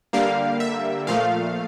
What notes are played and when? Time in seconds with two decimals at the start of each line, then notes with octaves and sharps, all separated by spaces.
0.13 D3 G3 A#3 F5
0.60 E5
1.07 A#2 F3 A3 F5